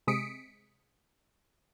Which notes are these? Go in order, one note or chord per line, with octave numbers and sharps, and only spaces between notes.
C3 G#3 D#6 B6 C#7 D7